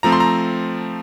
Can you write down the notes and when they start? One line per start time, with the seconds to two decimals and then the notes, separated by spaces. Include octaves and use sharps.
0.03 F3 A3 C4 A#5
0.12 C6
0.20 A#5